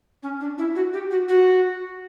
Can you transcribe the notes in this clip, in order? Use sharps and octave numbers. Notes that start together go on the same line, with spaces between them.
C#4
D4
E4
F#4
G4
F#4
F#4